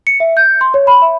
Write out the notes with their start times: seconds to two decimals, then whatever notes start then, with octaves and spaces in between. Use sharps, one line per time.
0.07 C#7
0.20 E5
0.37 G6
0.61 C6
0.74 C#5
0.87 B5
1.02 E5